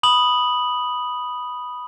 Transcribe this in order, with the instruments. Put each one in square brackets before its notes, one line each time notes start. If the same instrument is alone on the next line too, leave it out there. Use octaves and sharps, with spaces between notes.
[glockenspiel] B5 D#6 F#7